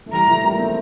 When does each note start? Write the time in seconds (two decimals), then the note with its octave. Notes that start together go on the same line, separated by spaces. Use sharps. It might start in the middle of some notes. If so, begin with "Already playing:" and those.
0.06 A3
0.12 E3 G3 A#5
0.28 F3 A3
0.44 G3 A#3
0.59 A3 C4